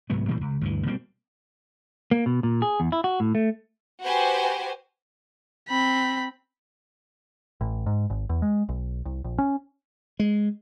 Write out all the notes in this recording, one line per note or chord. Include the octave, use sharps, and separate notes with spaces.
C2 G#2 F#3 B3
A#2 E3 G3 A#3
C#2
D2 G2 E3
B2 G3 A#3 C4
A#3
B2
A#2
G#4
E2
E4
F#4
A2
A3
F#4 G4 B4 C5 G5 G#5
C4 B5
A1
G#2
G#1
E2
G#3
B1
C2
A#1
C#4
G#3